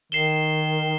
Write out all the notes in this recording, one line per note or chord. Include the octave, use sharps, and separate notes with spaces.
D#3 C7 E7 G7